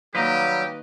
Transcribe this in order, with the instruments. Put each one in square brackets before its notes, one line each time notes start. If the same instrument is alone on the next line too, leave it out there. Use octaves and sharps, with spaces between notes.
[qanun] D#3 A#3 [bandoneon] F#3 G3 [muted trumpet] G4 [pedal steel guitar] B4 D#5 A#5